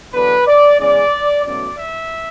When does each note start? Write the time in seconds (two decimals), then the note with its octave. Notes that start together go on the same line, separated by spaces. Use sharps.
0.14 E2 D3 F#3 B3 D4 B4
0.47 D5
0.79 E2 C#3 G#3 C#4 D5
1.45 E2 B2 F#3 A3 C#4 D5
1.78 E5